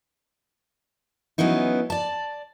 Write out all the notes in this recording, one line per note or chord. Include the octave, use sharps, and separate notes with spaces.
E3 F#3 B3 C#4 D#4 E4
D5 A5